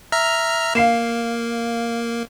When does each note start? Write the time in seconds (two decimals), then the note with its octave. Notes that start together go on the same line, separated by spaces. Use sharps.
0.12 E5 A#5 F6
0.75 A#3 F5 C7 E7